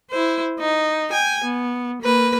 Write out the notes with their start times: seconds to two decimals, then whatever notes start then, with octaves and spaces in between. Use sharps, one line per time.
0.10 E4 C5
0.60 D#4
1.11 G5 G#5
1.44 B3
2.02 A#3 B4